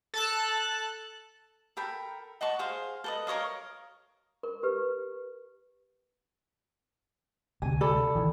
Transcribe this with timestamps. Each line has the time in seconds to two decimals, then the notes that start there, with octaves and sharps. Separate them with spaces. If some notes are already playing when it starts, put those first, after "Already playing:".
0.14 A4 A5 F#6
1.77 A4 A#4 G5 B5
2.41 D#5 F#5 A5 C#6
2.59 G#4 C5 F5
3.04 A4 B4 D#5
3.27 A#4 C#5 D#5 F5
4.43 A#4
4.63 G4 B4
7.62 D2 C3 G#5
7.81 A4 D5 B5
8.15 D#3 E3